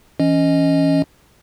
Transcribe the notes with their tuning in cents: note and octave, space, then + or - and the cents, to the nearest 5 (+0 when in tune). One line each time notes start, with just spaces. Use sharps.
E3 +0 C#4 +0 D#5 +0